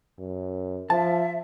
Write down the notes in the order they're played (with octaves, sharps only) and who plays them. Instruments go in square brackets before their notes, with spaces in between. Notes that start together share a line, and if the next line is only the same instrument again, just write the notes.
[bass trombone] F#2
[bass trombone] F3 [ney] E5 [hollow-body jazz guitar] A5